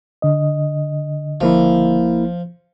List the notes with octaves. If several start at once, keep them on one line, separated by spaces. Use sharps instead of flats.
D3 D#5
G1 F3 A#3 E4